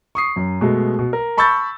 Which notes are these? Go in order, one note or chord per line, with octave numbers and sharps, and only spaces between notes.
C#6 D#6 C7
F#2
B2 G#3 A3
B2
A#4
A5 B5 C#6 E6 G6 A6